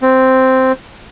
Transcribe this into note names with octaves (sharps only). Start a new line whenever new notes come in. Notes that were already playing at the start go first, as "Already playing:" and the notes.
C4